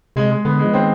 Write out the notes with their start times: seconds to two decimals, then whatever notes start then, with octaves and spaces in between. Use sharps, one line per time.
0.16 C3 G#3
0.30 G#3
0.45 D3 B3
0.59 G#3
0.64 F3
0.73 D#3 C4